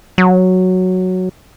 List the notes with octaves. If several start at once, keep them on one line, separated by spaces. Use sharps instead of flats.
F#3